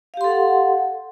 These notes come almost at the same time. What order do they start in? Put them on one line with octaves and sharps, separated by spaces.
F5 G4 C6 A4 F#5